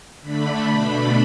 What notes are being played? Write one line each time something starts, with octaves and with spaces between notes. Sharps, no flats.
D3 A3 D4 B5
B2 A3 D4